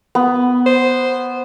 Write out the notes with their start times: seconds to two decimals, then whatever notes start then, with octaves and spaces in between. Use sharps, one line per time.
0.15 B3
0.66 C5